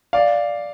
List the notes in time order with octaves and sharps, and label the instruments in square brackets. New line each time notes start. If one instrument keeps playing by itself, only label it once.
[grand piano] D5 F5